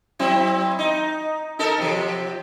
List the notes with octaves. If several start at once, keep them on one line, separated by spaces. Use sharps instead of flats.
F#3 C4 E4
D#4
D#4 A4 A#4
C3 F3